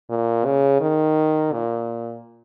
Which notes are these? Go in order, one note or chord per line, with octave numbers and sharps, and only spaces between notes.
A#2
C#3
D#3
A#2